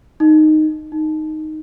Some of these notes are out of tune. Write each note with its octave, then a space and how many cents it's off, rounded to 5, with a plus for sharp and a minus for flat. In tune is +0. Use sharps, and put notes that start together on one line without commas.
D#4 -5
D#4 +0